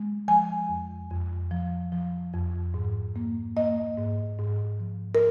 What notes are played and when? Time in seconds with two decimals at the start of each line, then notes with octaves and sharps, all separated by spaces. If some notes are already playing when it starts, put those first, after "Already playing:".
Already playing: G#3
0.28 F3 G#5
0.69 F2
1.10 F2
1.51 F3
1.92 F3
2.33 F2
2.74 G#2
3.16 A#3
3.57 A#3 D#5
3.98 G#2
4.39 G#2
4.80 F3
5.15 A#4